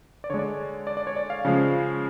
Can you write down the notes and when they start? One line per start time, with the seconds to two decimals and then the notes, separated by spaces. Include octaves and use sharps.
0.24 D5
0.30 D3 G#3 C#5
0.39 D5
0.87 D5
0.97 D5
1.07 C#5
1.17 D5
1.30 F5
1.45 C#3 F3 G#3